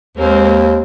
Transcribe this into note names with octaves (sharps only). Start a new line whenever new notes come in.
D#2 G#3 A#3 C4